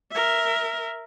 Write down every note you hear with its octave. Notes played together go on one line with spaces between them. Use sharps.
A#4 E5